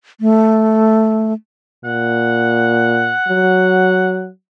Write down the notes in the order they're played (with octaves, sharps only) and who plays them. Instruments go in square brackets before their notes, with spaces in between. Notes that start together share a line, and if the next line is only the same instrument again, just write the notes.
[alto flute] A3
[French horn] A#2 [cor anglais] F#5
[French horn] F#3